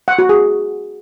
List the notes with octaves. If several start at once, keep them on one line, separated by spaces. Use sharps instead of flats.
F#5
F#4
G#4